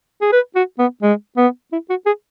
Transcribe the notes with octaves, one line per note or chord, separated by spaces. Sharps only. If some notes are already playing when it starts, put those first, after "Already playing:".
G#4
B4
F#4
B3
G#3
B3
E4
F#4
G#4